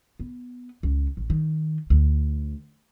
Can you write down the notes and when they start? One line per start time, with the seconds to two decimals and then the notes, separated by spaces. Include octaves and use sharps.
0.20 B3
0.83 C#2
1.17 A1
1.30 D#3
1.90 D2